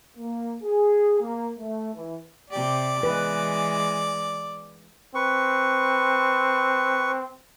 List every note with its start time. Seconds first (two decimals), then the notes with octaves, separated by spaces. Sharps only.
0.18 A#3
0.64 G#4
1.21 A#3
1.59 A3
1.95 E3
2.50 C3 G4 D5
3.03 E3 G#3 B4
5.15 C4 B4 C#6